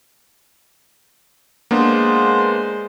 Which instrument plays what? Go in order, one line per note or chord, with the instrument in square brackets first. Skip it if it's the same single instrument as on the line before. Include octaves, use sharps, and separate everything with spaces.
[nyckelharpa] G#3 C5 [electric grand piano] A#3 B3 D4